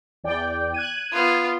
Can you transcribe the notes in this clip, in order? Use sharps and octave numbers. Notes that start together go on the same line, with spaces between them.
E2 D5 G5
F#6 G#6 D#7
B3 F4